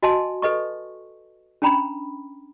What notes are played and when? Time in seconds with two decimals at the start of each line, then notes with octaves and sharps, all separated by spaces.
0.03 F#4 D#5 G#5 A5 C6
0.42 A4 B4 D#5 C#6
1.62 C#4 D4 G5 A#5 B5